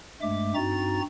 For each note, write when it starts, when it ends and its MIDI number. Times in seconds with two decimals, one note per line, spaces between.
0.22 0.54 43
0.22 0.54 56
0.22 0.54 57
0.22 0.54 76
0.22 0.54 86
0.55 1.01 43
0.55 1.01 60
0.55 1.01 63
0.55 1.01 66
0.55 1.01 82
0.55 1.01 93